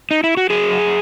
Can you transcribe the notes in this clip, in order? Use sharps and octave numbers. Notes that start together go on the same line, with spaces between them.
D#4
E4
F#4
F#3 G#4
F#2